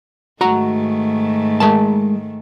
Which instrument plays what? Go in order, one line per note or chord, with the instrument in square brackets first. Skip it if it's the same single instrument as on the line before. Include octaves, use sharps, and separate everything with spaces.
[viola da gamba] G#2 D#3 A3 [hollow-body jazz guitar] F#4 A#5
[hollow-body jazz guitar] G#3 A#4 A5